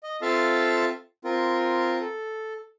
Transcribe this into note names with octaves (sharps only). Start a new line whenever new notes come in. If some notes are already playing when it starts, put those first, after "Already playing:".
D#5
C4 F4 A4 E5 F5 A5
C4 F4 A#4
A4